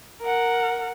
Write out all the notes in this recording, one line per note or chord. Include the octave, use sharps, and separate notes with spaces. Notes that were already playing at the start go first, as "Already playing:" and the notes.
A#4 F#5